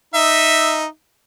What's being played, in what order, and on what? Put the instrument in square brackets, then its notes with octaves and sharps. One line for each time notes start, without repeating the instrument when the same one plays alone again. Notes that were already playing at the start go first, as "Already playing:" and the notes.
[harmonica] D#4 E5